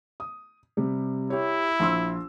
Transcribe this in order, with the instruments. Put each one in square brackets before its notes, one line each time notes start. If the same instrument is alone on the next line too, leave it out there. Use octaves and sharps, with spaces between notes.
[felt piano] D#6
C3 G3
[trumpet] E4 [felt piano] G4 C#5
[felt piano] A#1 C6 E6